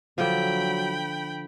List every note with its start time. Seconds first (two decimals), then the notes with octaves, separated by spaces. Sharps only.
0.18 D3 F3 F#3 G5 B5